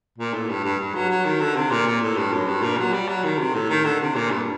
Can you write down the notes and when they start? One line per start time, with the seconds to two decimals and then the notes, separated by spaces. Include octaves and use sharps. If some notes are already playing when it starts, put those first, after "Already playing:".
0.18 A#2
0.34 A2
0.49 G2
0.64 G2
0.79 G2
0.95 F#3
1.10 F#3
1.25 D#3
1.40 D3
1.56 C3
1.71 A#2
1.86 A#2
2.01 A2
2.16 G2
2.33 F#2
2.48 G2
2.62 A#2
2.78 F#3
2.93 G3
3.08 F#3
3.24 D#3
3.39 C3
3.54 A2
3.69 D#3
3.85 D3
4.00 C3
4.15 A#2
4.31 G2